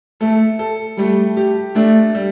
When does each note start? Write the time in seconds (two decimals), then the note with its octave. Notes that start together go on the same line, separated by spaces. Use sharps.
0.21 A3 A4
0.59 A4
0.98 G3 A3
1.37 G4
1.76 A3 D4
2.15 G3